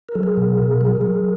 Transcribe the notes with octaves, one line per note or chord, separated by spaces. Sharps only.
A#4
F#3 A4
G#4 A#4
B2
B2
F#3
F#3